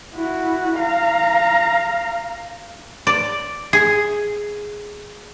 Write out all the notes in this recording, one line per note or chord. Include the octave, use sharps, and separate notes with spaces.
E4 F#4
F5 A#5
D5
G#4